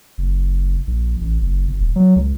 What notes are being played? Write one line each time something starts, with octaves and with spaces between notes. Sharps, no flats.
F#1
A#1
A1
F#1
G1
D#1
F#3
C#2